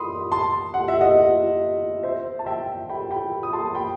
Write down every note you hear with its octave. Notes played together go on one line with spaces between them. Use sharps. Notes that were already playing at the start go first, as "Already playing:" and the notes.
Already playing: B5 C6 D#6
A5 C6
F#5
E5
D#5 F#5
C5 E5
A5
E5 G5
G5 B5
G5 B5
D#6
A5 C6
G5 B5